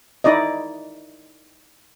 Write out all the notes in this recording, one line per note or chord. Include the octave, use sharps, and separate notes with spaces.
D#4 E4 D5 D#5